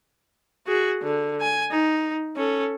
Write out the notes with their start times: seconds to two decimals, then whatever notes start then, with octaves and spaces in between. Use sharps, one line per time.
0.67 F#4 G#4
1.02 D3
1.41 G#5
1.70 D#4
2.36 C#4 A4